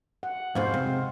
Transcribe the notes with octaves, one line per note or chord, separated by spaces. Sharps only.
F#5
F2 G#2 B2 C5 F5
C3 G#3